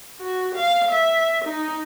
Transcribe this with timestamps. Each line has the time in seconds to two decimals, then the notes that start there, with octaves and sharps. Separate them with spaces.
0.20 F#4
0.55 F5
0.91 E5
1.45 D#4